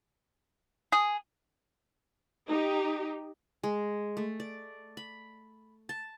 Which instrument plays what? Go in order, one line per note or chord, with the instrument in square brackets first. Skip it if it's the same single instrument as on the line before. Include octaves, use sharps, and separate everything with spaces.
[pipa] G#4
[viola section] D#4 G4
[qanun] G#3
A3
D5
B5
A5